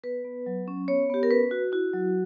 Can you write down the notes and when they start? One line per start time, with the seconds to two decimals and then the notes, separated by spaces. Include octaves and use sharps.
0.04 B3 B4
0.24 B3
0.46 F#3
0.68 C#4
0.88 B3 C#5
1.10 B3 G4
1.23 A#4
1.30 C#4 B4
1.51 F#4
1.72 E4 F#4
1.94 F#3